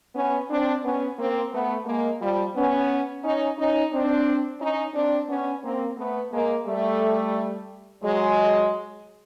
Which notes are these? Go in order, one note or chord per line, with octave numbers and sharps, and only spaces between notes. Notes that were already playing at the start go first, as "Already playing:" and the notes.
B3 C#4
C4 D4
B3 C#4
A#3 C4
A3 B3
G#3 A#3
F3 G3
B3 C#4
C#4 D#4
C#4 D#4
C4 D4
C#4 D#4
C4 D4
B3 C#4
A#3 C4
A3 B3
G#3 A#3
G3 A3
F#3 G#3